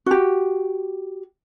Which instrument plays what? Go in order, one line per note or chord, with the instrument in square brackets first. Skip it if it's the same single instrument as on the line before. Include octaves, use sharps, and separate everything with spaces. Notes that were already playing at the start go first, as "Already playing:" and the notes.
[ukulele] F#4 G4